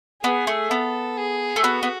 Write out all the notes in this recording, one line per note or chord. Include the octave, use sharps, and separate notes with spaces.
B3 G#4
A3
B3 A4
G#4
A3
B3 F#4
B3